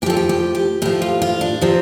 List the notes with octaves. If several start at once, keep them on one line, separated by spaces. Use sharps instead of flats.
A2 F3 G4 A4
G4
G4
G4
A2 F3 G4
F4
F4
D4
C3 F3 C4